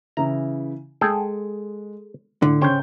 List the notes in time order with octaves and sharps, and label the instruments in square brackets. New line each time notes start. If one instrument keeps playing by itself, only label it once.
[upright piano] C#3 E3 E4 [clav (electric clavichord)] A#5
[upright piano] G#3 [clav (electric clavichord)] G#4 A4 G5
[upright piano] A2 [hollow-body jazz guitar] D3
[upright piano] C#3 G6 [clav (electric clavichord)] C5 C#5 G5